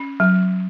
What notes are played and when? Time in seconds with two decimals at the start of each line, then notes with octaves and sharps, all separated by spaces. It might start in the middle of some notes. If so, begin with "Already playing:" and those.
Already playing: C#4
0.20 F#3